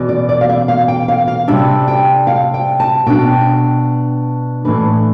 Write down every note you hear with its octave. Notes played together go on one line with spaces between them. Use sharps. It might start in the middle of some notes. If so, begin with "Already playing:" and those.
Already playing: E2 B2 B3
D5
D5
F5
E5
F5
G5
F5
F5
C3 G3 D4 E5
G5
F5
G5
A5
B2 B3 D4 G5
A2 E3 A3 D4 B4